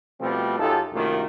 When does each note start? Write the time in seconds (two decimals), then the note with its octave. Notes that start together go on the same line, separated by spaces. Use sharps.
0.20 B2 F3 G3 A3 C4
0.59 F#2 D#4 F4 G4 A4
0.92 C2 F#2 D#3 A3 A#3 F4